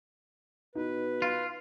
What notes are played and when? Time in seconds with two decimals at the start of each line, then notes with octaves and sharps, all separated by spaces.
0.75 B2 D#4 B4
1.22 F4